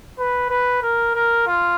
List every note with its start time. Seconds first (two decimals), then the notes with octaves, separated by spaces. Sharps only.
0.19 B4
0.51 B4
0.83 A#4
1.15 A#4
1.47 F4